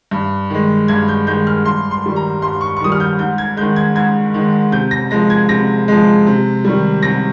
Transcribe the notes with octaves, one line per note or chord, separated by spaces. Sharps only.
G2
D#3 G#3
G2 G#6
G6
D#3 G#3 G6
F6
G2 C6
C6
D#3 G3
A#5
G2 C6
C#6
C#6
D#3 G3 D#6
F6
G6
G#2 G6
G#6
D#3 G#3 G6
G#6
G#2 G#6
D#3 G#3
C3 G6
A#6
F3 G#3 A#6
G#6
C3 A#6
F3 G#3
C3
D#3 G3
C3 A#6